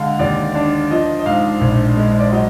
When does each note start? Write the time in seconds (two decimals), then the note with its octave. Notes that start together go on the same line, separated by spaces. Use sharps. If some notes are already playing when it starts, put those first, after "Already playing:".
Already playing: D3 G#3 D#5 F5
0.19 D#2 D5
0.55 D4
0.91 F3 D#5
1.19 D#5
1.26 G#2 F5
1.61 A#1
1.97 G#3
2.20 D5
2.32 F#3 D#5